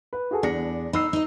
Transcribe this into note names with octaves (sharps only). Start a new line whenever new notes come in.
B4
F#4 G#4 A4
E2 D4 A#6 C#7
D#4 B5 E6 C7
D#4 D#5